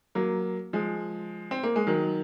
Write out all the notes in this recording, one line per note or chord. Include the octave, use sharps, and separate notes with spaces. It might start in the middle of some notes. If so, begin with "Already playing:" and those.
F#3 A#3
F3 G#3
C4
A#3
G#3
D#3 F#3